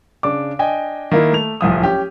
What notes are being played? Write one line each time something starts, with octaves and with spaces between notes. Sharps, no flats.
C#3 D4 D6
D4 D#5 G5 G#5
D#3 A#3 E4
A3 F7
D1 C2 F3 D#6
C#4 G4